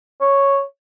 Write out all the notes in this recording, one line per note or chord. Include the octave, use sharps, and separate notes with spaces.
C#5